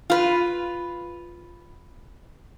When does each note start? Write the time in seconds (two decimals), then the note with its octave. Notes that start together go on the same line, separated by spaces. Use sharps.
0.10 F4 B4